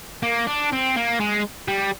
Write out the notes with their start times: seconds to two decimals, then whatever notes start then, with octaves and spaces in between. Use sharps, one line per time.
0.23 A#3
0.47 D4
0.72 C4
0.96 A#3
1.20 G#3
1.68 G3